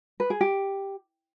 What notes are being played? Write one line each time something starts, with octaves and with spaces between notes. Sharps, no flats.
B4
G#4
G4